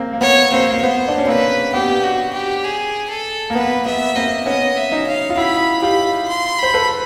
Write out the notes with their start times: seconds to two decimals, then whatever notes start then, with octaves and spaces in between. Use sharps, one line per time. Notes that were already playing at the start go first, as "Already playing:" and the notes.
Already playing: A#3 C4
0.13 A#3
0.21 B3 C#5
0.51 A#3 C4 C5
0.72 A#3
0.82 B3 C5
1.08 D4
1.18 C#4
1.27 A#3 C4 B4
1.73 B3 G4
2.04 F#4
2.33 G4
2.64 G#4
3.10 A4
3.50 A#3
3.55 B3 B4
3.86 B3 E5
4.15 A#3 C4 D#5
4.46 B3 C#4 D#5
4.76 E5
4.92 C#4 D#4
5.07 F5
5.30 F4
5.37 E4 F#4 B5
5.82 F4 G4 B5
6.28 C6
6.59 C5 B5
6.74 A4 B4